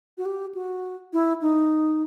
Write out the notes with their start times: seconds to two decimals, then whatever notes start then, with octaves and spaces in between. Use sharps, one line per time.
0.18 F#4
0.25 G4
0.55 F#4
1.13 E4
1.42 D#4